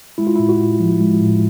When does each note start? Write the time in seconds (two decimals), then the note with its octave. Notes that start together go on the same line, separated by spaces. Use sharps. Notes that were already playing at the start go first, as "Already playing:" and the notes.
0.18 G#3 E4
0.27 F4
0.35 A2 E4
0.49 F#4
0.58 A2
0.80 F3
1.00 G#3
1.20 A2